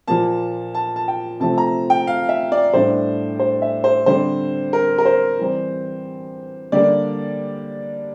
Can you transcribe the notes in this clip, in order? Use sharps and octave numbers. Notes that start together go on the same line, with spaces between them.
A#2 F3 A#3 A5
A5
A5
G5
C3 F3 A3 C4 A5
A#5
G5
F5
E5
D5
A2 G3 D4 C5
C5
E5
C5
D3 G3 C4 C5
A#4
A#4
C5
E3 G3 C4
D3 G3 A#3 D4 D5